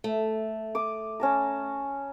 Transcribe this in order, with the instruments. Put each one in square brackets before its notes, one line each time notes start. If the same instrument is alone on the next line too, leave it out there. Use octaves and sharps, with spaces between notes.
[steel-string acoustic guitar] A3
[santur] D6 D#6
C#4 A5 A#5